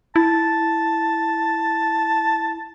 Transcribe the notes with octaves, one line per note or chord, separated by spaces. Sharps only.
E4 A5